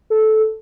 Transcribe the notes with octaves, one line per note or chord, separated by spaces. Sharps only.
A4